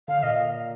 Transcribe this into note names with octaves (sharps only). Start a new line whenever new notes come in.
D3 F5
A#2 D#5